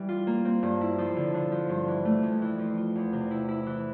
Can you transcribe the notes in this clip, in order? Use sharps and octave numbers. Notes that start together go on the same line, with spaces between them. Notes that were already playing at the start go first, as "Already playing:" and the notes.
Already playing: E3 G3
F4
A#3
C4
G2
E4
F3
D3
D3
F3
G2
E3
A3
F2
E3
F3
F4
E2
C3
E4
E4
E3